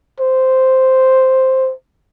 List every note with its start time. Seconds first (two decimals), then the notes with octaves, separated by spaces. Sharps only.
0.20 C5